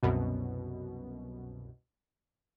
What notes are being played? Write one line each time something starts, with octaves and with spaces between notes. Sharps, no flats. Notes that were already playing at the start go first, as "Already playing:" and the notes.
C2 F#2 B2